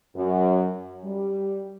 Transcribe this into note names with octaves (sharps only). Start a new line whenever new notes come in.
F#2
G3